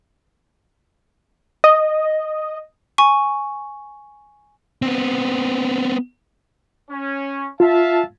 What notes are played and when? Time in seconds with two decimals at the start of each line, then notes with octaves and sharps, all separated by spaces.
1.64 D#5
2.98 G#5 C#6
4.82 B3 C4
6.90 C#4
7.60 F4 E5 F5 A5